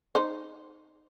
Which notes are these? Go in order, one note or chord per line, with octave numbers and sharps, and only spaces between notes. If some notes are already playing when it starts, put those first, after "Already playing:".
D#4 C5